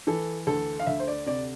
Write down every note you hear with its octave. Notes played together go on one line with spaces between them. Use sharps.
E3 A4
D2 A4
F5
D2 E5
C5
D5
C3 D5